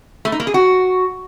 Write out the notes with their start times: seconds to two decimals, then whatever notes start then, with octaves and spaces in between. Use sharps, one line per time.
0.25 A3
0.32 D#4
0.40 A#3
0.47 G#4
0.54 F#4